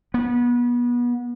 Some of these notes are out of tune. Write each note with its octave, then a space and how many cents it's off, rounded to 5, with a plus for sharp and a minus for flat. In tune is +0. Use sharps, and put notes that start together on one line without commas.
B3 -30